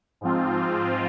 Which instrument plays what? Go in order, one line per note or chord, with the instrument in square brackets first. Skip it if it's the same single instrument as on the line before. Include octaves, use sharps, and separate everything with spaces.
[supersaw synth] G#2 F3 C4 F4